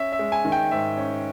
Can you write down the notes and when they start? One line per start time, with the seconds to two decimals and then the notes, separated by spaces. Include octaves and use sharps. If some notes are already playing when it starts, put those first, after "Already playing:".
Already playing: C#4 E5
0.12 E5
0.19 G#3
0.32 G#5
0.45 D#3
0.52 G5
0.71 G#2 E5
0.97 C#4